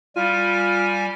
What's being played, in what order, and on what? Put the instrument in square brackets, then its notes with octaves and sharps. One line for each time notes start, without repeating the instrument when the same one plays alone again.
[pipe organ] G3 G#5 [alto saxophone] F4